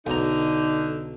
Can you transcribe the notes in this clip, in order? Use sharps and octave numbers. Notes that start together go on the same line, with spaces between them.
B1 D3 D#4 A#5